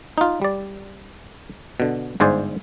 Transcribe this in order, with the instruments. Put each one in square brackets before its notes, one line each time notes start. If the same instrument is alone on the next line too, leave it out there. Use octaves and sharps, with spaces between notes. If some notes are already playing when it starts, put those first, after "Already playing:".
[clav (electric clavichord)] D#4 F4
G3 D5
B2 D3
G1 G#2 C5 D5 G#5